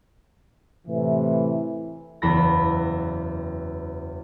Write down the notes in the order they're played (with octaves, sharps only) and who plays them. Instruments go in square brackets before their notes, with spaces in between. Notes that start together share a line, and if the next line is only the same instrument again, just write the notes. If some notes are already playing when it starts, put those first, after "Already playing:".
[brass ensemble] A2 C3 E3
[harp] F#1 E2 B5 A#6